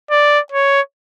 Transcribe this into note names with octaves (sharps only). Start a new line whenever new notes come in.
D5
C#5